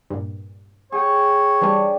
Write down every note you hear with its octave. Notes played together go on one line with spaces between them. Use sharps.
G2 A#2
G#4 C#5 G5
E3 G3 D4